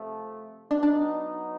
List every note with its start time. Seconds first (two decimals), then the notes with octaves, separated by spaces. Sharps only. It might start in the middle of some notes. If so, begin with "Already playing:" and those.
Already playing: C3 F3 A3
0.70 F#3 B3 D4 D#4
0.83 D4